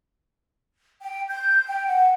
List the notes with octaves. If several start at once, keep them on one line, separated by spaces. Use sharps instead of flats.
G5
G6
G5
F#5